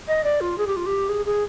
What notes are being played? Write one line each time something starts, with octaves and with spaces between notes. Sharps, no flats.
D#5
D5
F4
G#4
G4
F4
G4
G#4
G#4